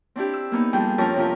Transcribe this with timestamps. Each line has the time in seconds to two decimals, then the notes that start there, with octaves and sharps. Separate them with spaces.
0.16 C4 D4 E4 G4
0.34 E6
0.52 A#3 B3 D#4
0.73 F2 G3 D4 G#4 G5
0.98 F2 C#4 A#4 A5 A#5
1.16 C3 C#4 F4 A#4